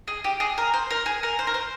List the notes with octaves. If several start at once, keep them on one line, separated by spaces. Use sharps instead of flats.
G#4
G4
G#4
A#4
C5
A#4
G#4
A#4
C5
A#4
C5